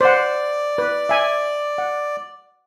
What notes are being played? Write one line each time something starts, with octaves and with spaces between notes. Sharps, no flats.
C5 D5 F#5
B4
E5 G#5
F#5